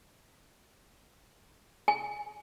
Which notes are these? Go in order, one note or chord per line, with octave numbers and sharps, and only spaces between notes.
G#5